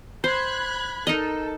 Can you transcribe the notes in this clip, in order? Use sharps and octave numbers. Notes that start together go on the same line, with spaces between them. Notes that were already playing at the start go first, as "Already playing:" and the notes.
C5 B5 F#6 G#6
D#4 A4 A#4 D#5